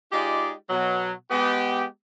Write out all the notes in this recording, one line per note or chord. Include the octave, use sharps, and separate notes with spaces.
G#3 D#4 F4 G4 G#4 D5
B2 F#3
G#3 B3 G4